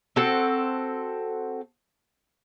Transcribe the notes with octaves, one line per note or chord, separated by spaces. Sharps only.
C4 F#4 A4